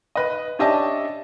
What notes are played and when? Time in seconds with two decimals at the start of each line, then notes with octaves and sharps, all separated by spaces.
0.15 B4 D#5
0.59 C#4 D4 G4 D#5 E5 A5